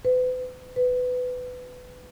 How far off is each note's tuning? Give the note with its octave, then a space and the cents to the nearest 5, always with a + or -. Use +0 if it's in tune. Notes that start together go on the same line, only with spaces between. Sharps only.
B4 +40
B4 +20